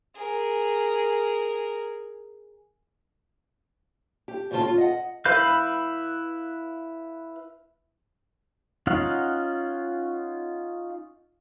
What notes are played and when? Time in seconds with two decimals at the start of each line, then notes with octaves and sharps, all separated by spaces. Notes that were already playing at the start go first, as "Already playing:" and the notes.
0.16 G#4 A#4
4.28 G4
4.51 D#2 A2 C#3 G#3 F4 A5
4.64 F4
4.78 D#5 F#5
5.25 E4 B4 F5 B5 G6
8.87 C#4 D#4 F4 F5 F#5